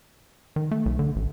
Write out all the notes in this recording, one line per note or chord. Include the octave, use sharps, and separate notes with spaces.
D#3
A3
B1
D3
A1